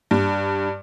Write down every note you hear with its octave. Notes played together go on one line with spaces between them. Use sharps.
G2